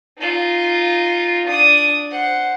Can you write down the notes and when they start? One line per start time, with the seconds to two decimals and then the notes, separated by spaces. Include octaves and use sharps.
0.18 D#4 F4
1.46 D4 D#6
2.11 C5 F#5